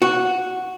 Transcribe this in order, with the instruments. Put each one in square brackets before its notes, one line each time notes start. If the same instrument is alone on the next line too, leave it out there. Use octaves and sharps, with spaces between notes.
[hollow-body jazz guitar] F#4